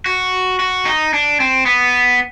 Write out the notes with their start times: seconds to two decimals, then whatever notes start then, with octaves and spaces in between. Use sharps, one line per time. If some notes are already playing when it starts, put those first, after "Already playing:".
0.06 F#4
0.59 F#4
0.85 D#4
1.13 D4
1.40 C4
1.66 B3